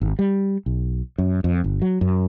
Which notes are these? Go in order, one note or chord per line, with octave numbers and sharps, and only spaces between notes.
G#1
G3
B1
F#2
F2
G1
F#3
F#2